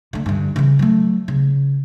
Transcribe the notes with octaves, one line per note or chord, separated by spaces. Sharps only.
D3 A3
G2 D3
C#3 E3
F#3 A3
C#3